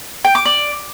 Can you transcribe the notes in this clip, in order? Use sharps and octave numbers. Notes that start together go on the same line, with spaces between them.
G5
D6
D5